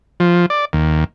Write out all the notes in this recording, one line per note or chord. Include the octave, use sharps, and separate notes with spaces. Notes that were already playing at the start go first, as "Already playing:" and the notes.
F3
D5
D#2